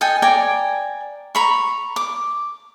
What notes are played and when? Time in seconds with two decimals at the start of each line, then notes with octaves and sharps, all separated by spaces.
0.01 A4 D#5 G5 G#5
0.22 D5 G5 G#5 A#5
1.35 A#5 B5 C#6
1.96 D6